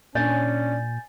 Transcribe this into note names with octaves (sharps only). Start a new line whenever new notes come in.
A#2 C#4 D4 D5 G#5 G6 A6